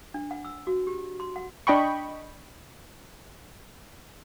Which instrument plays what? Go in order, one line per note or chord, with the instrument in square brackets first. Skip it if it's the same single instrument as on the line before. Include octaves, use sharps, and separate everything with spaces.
[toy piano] D4
F#5
E6
F#4
G4
C6
F#5
[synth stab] D4 D#5 G5 B5 C#6